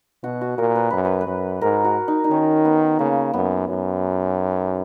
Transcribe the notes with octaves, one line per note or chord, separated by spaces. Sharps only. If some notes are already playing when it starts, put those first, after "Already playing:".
B2 F#4
F#4
A#2 A#4
B4
F#2 B4
B4
B4
F#2
G#2 A#4
F#4
D#4
D#4
D#3 C#4
B3
C#3 A#3
F#2 B3
F#2